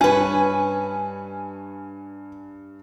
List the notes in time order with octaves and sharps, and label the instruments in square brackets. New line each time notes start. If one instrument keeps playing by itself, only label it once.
[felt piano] G2 [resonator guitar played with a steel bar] C#4 B4 [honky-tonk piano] G#5